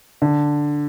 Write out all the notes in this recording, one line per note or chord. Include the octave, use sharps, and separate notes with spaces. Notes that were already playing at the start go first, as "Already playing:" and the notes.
D3